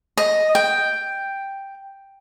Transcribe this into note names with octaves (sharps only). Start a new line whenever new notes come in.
D#5
G5